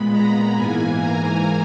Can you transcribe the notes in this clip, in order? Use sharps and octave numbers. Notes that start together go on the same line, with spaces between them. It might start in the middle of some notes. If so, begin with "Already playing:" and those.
Already playing: A#2 G#3 B3 B5
A#5
G#2 E3 A#3 G#5
A#5